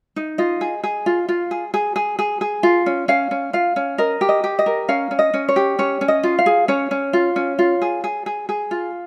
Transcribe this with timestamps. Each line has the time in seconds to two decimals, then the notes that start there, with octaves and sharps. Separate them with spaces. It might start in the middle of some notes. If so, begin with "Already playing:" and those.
0.16 D#4
0.38 F4 D#5
0.61 G#4
0.83 G#4
1.06 F4
1.29 F4
1.51 G#4
1.74 G#4
1.96 G#4
2.19 G#4
2.41 G#4
2.63 F4
2.86 C#4
3.08 C#4 F5
3.31 C#4
3.53 F4 F5
3.76 C#4
3.98 A#4 D#5
4.21 G4
4.29 D#5
4.44 G4
4.59 D#5
4.66 A#4
4.89 C#4 F5
5.11 C#4
5.19 D#5
5.34 C#4
5.48 C#5
5.56 G4
5.79 C#4 C#5
6.01 C#4
6.08 D#5
6.23 F4
6.39 F5
6.46 G#4
6.68 C#4 C#5
6.91 C#4
7.13 F4
7.36 C#4
7.59 F4
7.82 G#4
8.04 G#4
8.26 G#4
8.49 G#4
8.71 F4